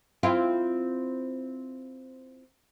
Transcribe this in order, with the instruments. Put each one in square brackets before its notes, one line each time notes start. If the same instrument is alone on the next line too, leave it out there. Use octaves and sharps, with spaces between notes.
[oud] C4 E4 F4